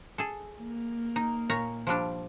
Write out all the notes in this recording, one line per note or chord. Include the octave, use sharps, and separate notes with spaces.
G#4 A4
A#3
D#4
A#2 C#5 A#5
F3 G3 D4